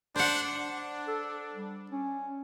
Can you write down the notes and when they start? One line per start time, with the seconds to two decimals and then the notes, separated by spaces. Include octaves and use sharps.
0.16 D4 C5 F#5
0.56 D4
1.08 A4
1.55 G3
1.91 C#4